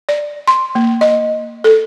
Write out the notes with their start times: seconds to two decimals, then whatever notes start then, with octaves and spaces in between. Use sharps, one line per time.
0.09 D5
0.48 C6
0.75 A#3
1.01 D#5
1.64 A4